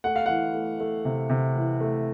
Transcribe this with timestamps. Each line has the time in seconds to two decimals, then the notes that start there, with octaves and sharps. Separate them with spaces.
0.04 A3 F#5
0.16 F5
0.26 E3 F#5
0.54 A3
0.80 A3
1.05 C3
1.30 C3
1.56 E3
1.80 A3